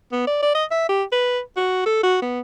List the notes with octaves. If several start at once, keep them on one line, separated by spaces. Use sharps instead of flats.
B3
D5
D5
D#5
E5
G4
B4
F#4
A4
F#4
B3